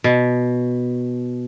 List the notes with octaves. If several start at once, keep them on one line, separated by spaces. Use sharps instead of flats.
B2